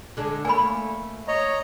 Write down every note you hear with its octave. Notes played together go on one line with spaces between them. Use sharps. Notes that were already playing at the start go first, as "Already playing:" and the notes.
D3 G#3 D4
A3 A#3 G#5 B5
C#5 D#5 A#5